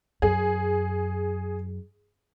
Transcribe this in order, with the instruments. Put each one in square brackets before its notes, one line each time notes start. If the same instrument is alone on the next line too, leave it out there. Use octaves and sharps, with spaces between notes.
[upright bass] F#2 [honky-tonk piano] G#4